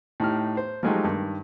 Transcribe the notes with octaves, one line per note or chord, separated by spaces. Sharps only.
A2 D#4 G4 F6
C5
F3 F#3 G#3 A3 D#4 G4
G2 D#3